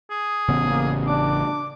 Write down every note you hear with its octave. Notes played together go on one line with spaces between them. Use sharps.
G#4
A1 C#3 B3
A#3
D4 D6